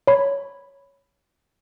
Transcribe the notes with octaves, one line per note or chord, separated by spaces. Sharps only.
C#5 B5